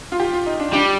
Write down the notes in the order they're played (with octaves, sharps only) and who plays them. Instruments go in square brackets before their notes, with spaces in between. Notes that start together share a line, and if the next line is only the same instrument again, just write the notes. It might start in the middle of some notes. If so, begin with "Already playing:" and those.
[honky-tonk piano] F4
G4
F4
D#4
D4
[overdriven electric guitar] G3 [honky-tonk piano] D4